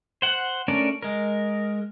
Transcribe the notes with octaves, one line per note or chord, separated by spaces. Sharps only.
C5 F#5
A3 C#4 D4 A#4 D5
G#3 A#4